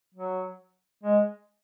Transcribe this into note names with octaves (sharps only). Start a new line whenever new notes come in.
F#3
G#3